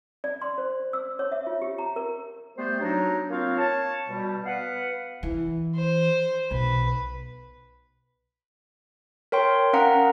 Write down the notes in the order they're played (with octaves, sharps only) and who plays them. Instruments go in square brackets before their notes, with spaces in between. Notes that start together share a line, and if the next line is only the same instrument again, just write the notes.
[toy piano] D5
C6
C5
E6
C#5
E5
F4
G4
A#5
A#4
[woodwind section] G3 A3 B3 C5
F#3 D4 D#4
A#3 C4 F4 C#5 F5
C#5 A5
B2 G3
B3 B4 F5 F#5
[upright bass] E3
[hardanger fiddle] C5
[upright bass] B1 [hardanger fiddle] B4
[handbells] A#4 C#5 G5 C6
C#4 A#4 F5 F#5 A#5